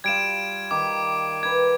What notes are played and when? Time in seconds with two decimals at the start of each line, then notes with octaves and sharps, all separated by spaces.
0.04 G3 F4 G#6 D7 E7
0.71 D#3 D6
1.43 B4 A#5 G#6